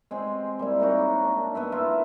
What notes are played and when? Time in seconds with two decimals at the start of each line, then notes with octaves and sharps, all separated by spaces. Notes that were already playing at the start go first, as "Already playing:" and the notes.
0.11 G#3 C4 G4 G#4
0.59 G3 A#3 E4
0.80 A#3 D#4 F#4 C#5
1.24 D4
1.55 B3 B4 E5
1.72 E4 F4 A#4 E5